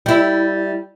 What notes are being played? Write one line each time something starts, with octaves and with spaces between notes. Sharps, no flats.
G3 E4